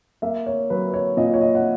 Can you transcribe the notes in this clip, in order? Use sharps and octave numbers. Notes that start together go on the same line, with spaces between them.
A#3 E5
C#5
F#3 B4
C#5
A#2 D#5
C#5
D#5
F#5